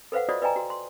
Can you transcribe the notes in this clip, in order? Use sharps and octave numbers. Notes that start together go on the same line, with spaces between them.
A4 B4 C5 F5 F#5
F4 F#4 C5 D5 D#5 D#6
B4 D5 D#5 G5 G#5 A#5
F#4
C6